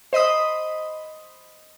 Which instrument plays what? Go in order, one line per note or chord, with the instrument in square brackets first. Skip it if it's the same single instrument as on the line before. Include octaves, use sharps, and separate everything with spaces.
[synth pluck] C5 D#5 B5 D#6